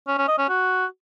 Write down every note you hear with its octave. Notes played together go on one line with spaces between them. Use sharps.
C#4
C#4
D#5
C#4
F#4